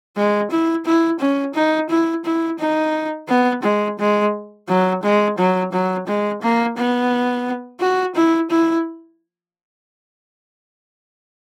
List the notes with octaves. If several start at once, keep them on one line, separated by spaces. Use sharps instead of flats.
G#3
E4
E4
C#4
D#4
E4
E4
D#4
B3
G#3
G#3
F#3
G#3
F#3
F#3
G#3
A#3
B3
F#4
E4
E4